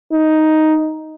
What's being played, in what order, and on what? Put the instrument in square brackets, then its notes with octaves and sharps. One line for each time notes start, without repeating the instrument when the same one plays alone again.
[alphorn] D#4